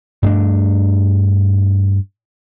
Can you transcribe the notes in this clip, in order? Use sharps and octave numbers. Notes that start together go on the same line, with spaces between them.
G2 A3 D4